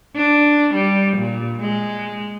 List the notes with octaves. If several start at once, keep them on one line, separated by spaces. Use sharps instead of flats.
D4
G3
A#2
G#3